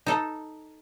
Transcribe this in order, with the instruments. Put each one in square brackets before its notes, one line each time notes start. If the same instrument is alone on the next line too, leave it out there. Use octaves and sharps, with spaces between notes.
[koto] D#4 A4